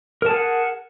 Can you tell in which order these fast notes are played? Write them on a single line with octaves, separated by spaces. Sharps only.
A#4 A5 G#4 F#5